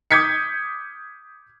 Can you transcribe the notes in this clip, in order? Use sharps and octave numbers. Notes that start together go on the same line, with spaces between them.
D6 D#6 G6 G#6 B6 C#7